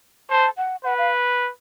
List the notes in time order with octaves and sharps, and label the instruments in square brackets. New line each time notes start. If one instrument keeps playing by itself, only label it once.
[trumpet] C5 [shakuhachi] A5
[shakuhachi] F#5
[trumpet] B4 [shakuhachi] F#5
[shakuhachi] F5